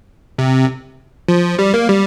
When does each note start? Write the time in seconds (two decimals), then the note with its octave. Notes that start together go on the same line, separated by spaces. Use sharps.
0.39 C3
1.28 F3
1.59 G3
1.74 A#3
1.89 G3